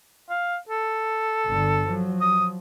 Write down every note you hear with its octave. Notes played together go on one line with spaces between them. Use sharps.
F5
A4
G1 D3
F3 F#3
D#6